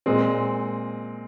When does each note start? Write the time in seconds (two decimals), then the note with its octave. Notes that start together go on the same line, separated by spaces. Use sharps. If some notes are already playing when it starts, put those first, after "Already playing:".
0.06 A#2 G#3 C4